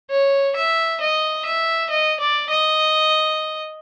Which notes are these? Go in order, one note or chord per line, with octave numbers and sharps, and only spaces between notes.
C#5
E5
D#5
E5
D#5
D5
D#5